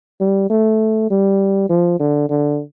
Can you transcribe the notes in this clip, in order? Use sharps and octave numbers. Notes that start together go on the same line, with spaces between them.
G3
A3
G3
F3
D3
D3